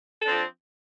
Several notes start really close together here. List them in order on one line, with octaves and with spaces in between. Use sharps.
A4 D4 C4 F3